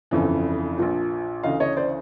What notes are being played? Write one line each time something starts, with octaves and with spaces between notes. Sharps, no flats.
G1 F2 C#3 E3
A#1 A#2 F3
D2 C#3 E3 D#5 F5
C#5 D#5
C5 D5